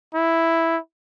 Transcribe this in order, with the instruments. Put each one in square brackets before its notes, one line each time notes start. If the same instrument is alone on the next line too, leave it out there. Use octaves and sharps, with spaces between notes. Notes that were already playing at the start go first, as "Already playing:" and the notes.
[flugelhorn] E4